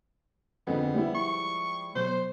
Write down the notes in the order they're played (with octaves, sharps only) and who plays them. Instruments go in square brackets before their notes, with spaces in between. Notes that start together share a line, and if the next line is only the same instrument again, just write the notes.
[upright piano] F2 D3 [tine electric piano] F3 G#3 [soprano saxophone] B3
[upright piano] G3 E4
[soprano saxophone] C#6
[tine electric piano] B2 F#3 [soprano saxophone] C5